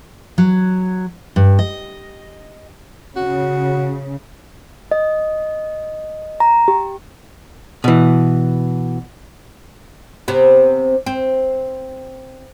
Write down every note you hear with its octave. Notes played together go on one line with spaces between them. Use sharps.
F#3
G2
D#5
C#3 F#4
D#5
A#5
G4
B2 E3
C3 B3
C4